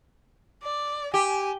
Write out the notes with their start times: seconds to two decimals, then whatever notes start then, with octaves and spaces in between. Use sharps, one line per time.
0.63 D5
1.14 G4 G#5